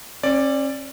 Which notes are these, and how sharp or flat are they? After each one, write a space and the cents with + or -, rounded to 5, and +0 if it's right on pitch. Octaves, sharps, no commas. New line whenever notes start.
C#4 -40 D5 +0